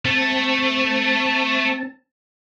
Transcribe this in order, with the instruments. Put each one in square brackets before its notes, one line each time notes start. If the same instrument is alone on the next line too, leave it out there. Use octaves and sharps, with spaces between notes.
[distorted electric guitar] A3 [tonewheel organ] C4 A5